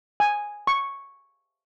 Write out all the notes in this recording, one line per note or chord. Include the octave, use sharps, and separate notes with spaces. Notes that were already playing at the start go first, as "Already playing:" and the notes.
G#5
C#6